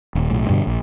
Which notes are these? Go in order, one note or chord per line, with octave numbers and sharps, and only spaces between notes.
D#1
B1 A2
G2 B2 D3
A#1